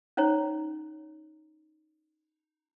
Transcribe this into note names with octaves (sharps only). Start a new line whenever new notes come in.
C#4 D#4 C5 C#5 A#5